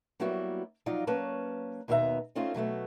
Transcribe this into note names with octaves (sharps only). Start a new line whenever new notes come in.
F#3 G3 A#3 B3 E4 F#4
F3 F#3 D#4 F4 D5
F#3 A#3 C#4 B4 C#5 A5
D#2 B2 B3 G4 E5 A#5
A3 C4 C#4 D#4 F4
B2 F#3 A3 B3